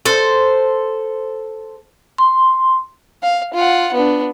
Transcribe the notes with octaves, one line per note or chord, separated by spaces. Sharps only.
A4 C5
C6
F5
F4 F#5
B3 D4